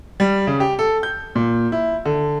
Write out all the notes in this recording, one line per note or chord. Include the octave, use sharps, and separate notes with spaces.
G3
C#3
G4
A4
G6
A#2
E4
D3